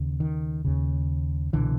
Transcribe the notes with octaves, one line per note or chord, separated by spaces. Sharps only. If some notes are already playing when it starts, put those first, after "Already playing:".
Already playing: D#2 C#3
D#3
D#2 C#3
C2 B2 D3 E3